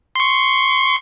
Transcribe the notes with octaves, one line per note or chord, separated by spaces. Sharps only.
C6 C#6